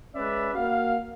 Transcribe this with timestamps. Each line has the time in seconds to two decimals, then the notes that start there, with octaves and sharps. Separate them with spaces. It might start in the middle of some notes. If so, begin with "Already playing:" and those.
0.14 G#3 C#4 B4 D5 E5
0.55 A#3 F#4 F5